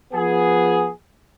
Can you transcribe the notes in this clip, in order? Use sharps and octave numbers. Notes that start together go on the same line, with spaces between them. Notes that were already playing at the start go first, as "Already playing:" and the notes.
F3 B3 G#4